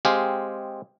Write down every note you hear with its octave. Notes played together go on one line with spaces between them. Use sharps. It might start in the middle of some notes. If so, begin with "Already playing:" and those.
G#3 C4 G4 G#4 F5